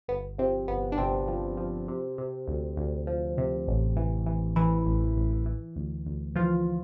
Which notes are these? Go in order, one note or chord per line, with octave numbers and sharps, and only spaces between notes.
G1 B3
C3 F3 C4
G1 B3
D4
G1 C3 C4
F3
F3
C3
C3
D2
D2
F3
C3
A1
E3
E3
A1 E3 E4
A1
A1
E3
D2
D2
E3 F3 F4